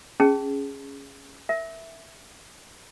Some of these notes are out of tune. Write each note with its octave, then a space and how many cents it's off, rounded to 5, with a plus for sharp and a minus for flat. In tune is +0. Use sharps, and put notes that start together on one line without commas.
C#4 +0 G#4 +0 A5 +0
A#4 +0 E5 +0